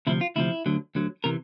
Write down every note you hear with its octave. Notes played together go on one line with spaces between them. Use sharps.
D2 C3 F3 E4
F4
D2 C3 F3 E4
D2 D3 F#3
D2 D3 F#3
C3 E3 A#4